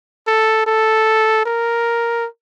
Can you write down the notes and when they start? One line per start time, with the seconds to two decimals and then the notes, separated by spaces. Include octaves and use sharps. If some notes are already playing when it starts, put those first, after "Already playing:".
0.27 A4
0.66 A4
1.45 A#4